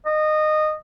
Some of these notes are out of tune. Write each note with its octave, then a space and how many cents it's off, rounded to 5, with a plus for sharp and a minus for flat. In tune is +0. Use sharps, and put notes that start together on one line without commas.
D#5 -20